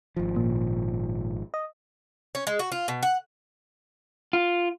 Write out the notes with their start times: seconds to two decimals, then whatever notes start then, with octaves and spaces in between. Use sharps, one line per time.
0.17 G#1 F3
0.36 A#2
1.54 D#5
2.35 C#4
2.47 G#3
2.59 F#4
2.72 F4
2.88 B2
3.03 F#5
4.33 F4